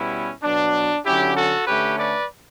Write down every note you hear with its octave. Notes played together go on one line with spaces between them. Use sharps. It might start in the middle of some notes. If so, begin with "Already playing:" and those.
Already playing: B2 G3 B3 C#4 E4
B2 F#3 B3 D4
D3 F#3 C#4 E4 G4
F#4 A4
D3 A3 C#4 G4 B4
B4 D5